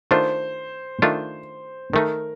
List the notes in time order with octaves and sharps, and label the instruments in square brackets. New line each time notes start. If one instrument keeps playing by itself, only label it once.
[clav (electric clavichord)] D#3 A3 D4 F4 [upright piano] C5
[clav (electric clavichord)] D#3 A3 D4 F4
[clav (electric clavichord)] D#3 A3 D#4 [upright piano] A#4